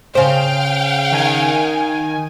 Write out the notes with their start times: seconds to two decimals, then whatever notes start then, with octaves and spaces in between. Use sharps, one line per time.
0.15 C#3 C5 F5 G5
1.11 D#3 G#5